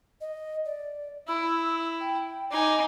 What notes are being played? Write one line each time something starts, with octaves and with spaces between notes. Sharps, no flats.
D#5
D5
E4 E6
G5
D#4 G#5 D6